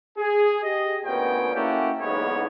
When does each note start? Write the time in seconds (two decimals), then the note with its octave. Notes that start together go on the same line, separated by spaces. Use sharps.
0.18 G#4
0.63 G4 D#5
1.05 D2 A#2 B3 C#4 G5
1.55 A#3 C#4 E4 F#4 G4 A4
2.00 B1 E2 G#2 C#3 B3 C#5